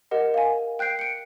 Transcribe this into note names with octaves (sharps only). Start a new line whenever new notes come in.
G4 A#4 D#5 F#5
F5 G#5
G5 F#6 G6 C7 D7
C#7 D7